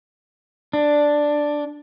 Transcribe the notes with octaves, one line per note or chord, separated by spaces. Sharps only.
D4